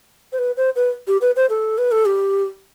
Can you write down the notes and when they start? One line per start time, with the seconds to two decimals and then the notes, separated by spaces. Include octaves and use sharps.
0.32 C5
0.39 B4
0.57 C5
0.76 B4
1.08 G4
1.21 B4
1.36 C5
1.50 A4
1.78 B4
1.92 A4
2.06 G4